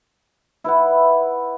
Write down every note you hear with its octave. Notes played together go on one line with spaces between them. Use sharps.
E4 B4 E5 F#5